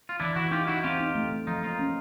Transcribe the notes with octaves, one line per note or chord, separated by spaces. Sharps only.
F4
E3 D4 E4
E3 E4 F#4
D#4 F4 G4
D#4 E4 F#4
C4 F4 G4
D#4
A3
A3
F3 D#4 F4
A#3 D#4 F4
C#4